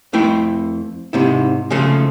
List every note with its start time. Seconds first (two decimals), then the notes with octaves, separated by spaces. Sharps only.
0.13 F2 A3 E4 G5
1.13 G#2 C3 E4
1.70 C#3 F3 A3 A4